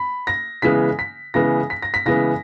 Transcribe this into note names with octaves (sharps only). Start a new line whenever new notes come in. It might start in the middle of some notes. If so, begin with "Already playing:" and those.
Already playing: B5
A#6
C#3 E3 G#3 B3 B6
B6
C#3 E3 G#3 B3 A#6
B6
A#6
B6
C#3 E3 G#3 B3 A#6